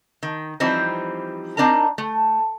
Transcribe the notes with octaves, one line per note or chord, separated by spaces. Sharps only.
D#3
E3 F3 G3 C4 D#4
C4 D4 D#4 A#4 A#5
A3